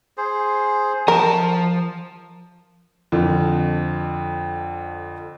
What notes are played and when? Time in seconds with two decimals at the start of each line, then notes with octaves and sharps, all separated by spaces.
0.17 G#4 C5
1.08 F3 A#4 A5
3.12 F2 D3 F3